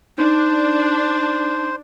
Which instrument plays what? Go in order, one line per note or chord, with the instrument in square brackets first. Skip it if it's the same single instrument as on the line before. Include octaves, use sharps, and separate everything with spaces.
[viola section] D4 [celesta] D#4 [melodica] C5